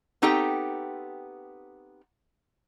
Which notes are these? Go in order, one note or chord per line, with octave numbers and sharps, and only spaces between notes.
B3 C4 D#4 G4 A4 G5